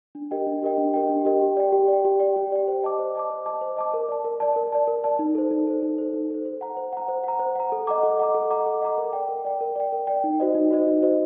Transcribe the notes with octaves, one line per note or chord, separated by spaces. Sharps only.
D4
G4 A#4 D#5 G5
D4
G4 A#4 D#5 G5
D4
G4 A#4 D#5 G5
D4
G4 A#4 D#5 G5
G4
D5 G5
G4
D5 G5
G4
D5 G5
G4
D5 G5
C5
D#5 A5 D6
C5
D#5 A5 D6
C5
D#5 A5 D6
C5
D#5 A5 D6
A#4
D5 A5
A#4
D5 A5
A#4
D5 A5
A#4
D5 A5
D#4
A4 C5
D#4
A4 C5
D#4
A4 C5
D#4
A4 C5
C5
F#5 A#5
C5
F#5 A#5
C5
F#5 A#5
C5
F#5 A#5
A4
D#5 F#5 A#5 D6
A4
D#5 F#5 A#5 D6
A4
D#5 F#5 A#5 D6
A4
D#5 F#5 A#5 D6
A#4
D5 G5
A#4
D5 G5
A#4
D5 G5
A#4
D5 G5
D#4
F#4 C5 D#5
D#4
F#4 C5 D#5
D#4
F#4 C5 D#5